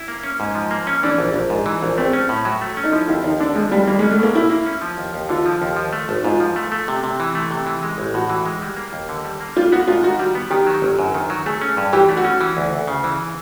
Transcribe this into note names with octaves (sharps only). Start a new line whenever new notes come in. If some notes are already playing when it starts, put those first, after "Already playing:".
Already playing: E4
A#3
C#4
G#2
F3
A#3
C#4
E3 D4
A#1
A#1
G#2
E3
A#1
A3 C4
C#4
A2
F#3
A3
C#4
D#4
F3 E4
D#2 E4
D#2 D#4
D3 D4
F3 G#3
D#2 G3
G3 A#3
G#3
C#4
A3
B2 A#3
G3 E4
A#3
C#4
F3
D#2
D#2
D3 F4
F3
D#2
F3
A3
G#1
G#2 F4
F3
A3
A3
C3
C3
E3
A3
C3
E3
G#3
A1
A2 F#4
E3
G#3
G3
A#3
D#2
D3
G3
A#3
G3 F4
B3 F#4
G#2 F4
D#3 F#4
G3
B3
D#3 G4
F#3
G1
F#2
D#3
F#3
A3 G#4
C#4
G2
E3 G4
A3
F#4
C#4
E3
D2
D2
C#3
E3